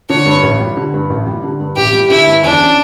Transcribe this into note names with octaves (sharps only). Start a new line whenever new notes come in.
D3 C#5
G2
A1
G3
D3
G2
A1
G3
D3
G2
A1 G4
G3
D3 E4
G2
E2 D4
C#4